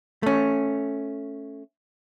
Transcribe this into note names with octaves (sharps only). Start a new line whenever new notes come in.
A3 C#4